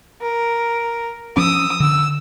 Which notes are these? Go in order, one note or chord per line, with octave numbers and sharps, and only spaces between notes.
A#4
F3 C#4 D#6 E6
D3 E6